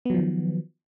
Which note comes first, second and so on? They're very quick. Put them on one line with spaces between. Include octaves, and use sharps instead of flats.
B3 F#3 F3 D#3